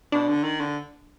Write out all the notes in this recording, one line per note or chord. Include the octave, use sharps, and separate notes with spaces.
B2 D4
D3
D#3
D3